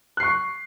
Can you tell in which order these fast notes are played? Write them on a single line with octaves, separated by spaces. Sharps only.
F#6 C7 C#6